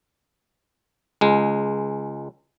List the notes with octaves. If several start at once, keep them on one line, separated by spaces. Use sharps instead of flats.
C#2 G#3